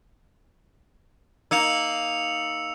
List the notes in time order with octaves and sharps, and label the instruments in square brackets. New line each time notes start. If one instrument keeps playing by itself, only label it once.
[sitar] A#3 D#4 [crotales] E6 C#7 F7